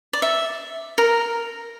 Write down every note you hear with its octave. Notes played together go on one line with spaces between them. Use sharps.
D5
E5
A#4